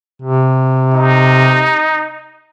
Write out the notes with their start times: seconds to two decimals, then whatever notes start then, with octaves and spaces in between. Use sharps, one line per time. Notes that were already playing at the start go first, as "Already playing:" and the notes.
0.22 C3
0.93 D#4